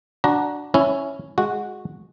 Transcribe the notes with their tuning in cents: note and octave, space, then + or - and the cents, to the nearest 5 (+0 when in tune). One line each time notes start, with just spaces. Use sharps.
D4 +0 F#4 +0 A#5 +20
C#4 +0 E4 +0
G#3 +0 F#4 -10